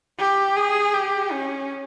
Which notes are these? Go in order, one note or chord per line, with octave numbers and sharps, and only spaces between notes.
G4
G#4
G4
C#4